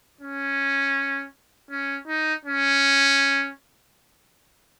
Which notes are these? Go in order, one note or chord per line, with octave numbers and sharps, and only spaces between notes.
C#4
C#4
D#4
C#4